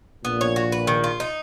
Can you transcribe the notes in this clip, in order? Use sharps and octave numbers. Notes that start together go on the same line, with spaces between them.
A#1 A#2 B3
C#5
F#4
B4
D#3
F4
D#4